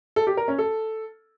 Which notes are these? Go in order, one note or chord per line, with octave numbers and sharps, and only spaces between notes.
A4
G4
A#4
C#4
A4